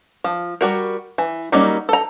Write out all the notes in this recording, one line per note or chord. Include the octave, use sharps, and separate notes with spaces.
F3
G3 F#4 A#4
E3
F#3 G3 A#3 C#4 D#4
A4 A#5